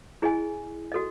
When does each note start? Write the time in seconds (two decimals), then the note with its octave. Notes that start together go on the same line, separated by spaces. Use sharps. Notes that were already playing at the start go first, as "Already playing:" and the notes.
0.22 E4 G#4 D#5 G#5
0.92 F#4 A4 D#5